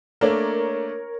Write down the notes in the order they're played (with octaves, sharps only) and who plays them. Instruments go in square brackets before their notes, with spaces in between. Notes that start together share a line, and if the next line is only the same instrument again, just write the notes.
[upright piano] A3 A#3 D4 [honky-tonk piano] A#4 C#5